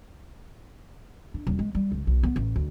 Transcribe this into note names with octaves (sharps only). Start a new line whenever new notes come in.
D4
D#1
G#3
G3
C#2
B1
B3
A1
D2